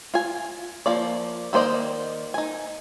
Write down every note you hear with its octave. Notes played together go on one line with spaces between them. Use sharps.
F4 G#5
F3 A#3 D5
D#3 A#3 C5 D5 D#5
D#4 G#5